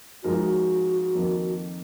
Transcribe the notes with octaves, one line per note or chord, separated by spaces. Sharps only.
G#2 F3 G#3 D#4 F#4 A#4
F4
F#4
F2 D#3 A#3